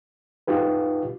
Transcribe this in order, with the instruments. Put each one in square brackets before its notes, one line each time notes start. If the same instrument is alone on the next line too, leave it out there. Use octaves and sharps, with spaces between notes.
[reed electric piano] D#4 F4 G4 B4